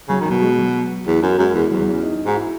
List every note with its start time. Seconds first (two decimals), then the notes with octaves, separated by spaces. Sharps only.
0.09 C#3 F#3
0.21 D#3
0.26 B2 F#3
0.42 G#3
0.58 F#3
1.07 E2
1.22 F#2
1.38 F#2 G#3
1.54 E2
1.71 E2 F#3
1.82 F#3
1.92 C#4
2.03 D#4
2.26 G#2 F#4
2.35 E4